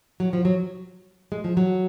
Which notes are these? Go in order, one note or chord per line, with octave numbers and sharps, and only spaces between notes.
F#3
F3
F#3
G#3
F3
F#3